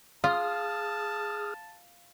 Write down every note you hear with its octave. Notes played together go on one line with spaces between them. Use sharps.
F4 G#4 F5 A5 D#6 F6